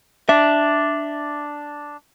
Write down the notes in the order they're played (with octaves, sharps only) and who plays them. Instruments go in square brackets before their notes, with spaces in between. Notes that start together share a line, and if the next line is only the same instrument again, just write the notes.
[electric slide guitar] D4 [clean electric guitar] E5